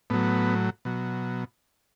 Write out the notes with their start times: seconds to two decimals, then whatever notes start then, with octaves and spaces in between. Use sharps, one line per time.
0.10 A2 F#3 B3
0.85 B2 F#3